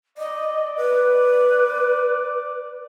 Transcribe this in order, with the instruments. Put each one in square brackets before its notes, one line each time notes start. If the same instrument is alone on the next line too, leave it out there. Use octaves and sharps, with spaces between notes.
[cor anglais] D5 [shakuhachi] D#5
[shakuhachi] B4